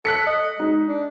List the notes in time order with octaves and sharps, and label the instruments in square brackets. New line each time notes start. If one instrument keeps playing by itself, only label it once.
[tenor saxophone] A4 [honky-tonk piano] F#6 B6 C#7
[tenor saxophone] D#5
[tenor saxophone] G#3 [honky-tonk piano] D#4
[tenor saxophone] D4